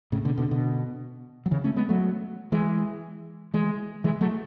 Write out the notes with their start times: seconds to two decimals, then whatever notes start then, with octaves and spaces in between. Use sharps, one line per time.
0.12 A2 C#3
0.25 B2 D3
0.37 B2 D3
0.51 B2 D3
1.46 F#3
1.51 C#3 E3
1.64 A3 C#4
1.76 G#3 B3
1.89 F#3 A3
2.52 E3 G#3
3.54 E3 G#3
4.04 E3 G#3
4.21 F#3 A3